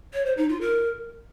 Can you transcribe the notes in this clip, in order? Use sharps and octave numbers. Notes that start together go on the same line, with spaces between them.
C#5
C5
D#4
F4
A#4